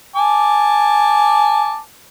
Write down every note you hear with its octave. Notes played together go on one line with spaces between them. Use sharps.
G#5 A5 D6